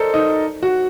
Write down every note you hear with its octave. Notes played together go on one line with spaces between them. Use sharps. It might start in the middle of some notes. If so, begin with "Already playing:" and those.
Already playing: A4 A#4 C5 D5 D#5
D#4
F#4